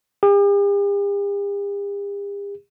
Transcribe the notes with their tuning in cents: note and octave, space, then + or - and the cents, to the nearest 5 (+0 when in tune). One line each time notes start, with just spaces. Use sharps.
G4 +45